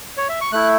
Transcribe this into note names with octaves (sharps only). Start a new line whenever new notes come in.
C#5
E5
C#6
A3 E4 F#6